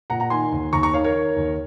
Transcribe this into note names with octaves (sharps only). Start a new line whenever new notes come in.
A#2 F#5 A#5
F#5 A#5
D#3 G#5 C6
D#2
D#2 A#5 C#6
A#5 C#6
D#3 C#5 F5
A#4 C#5
D#3
D#2